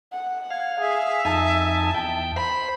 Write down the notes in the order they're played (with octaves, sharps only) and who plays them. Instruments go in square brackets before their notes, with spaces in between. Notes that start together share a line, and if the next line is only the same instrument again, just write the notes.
[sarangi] F#5
[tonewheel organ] F5 [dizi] G#6
[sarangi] G#4 [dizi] E5
[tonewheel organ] F2 D#4 G#5 [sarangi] A5
[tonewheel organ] E2 G5
[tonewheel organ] C5 [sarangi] B5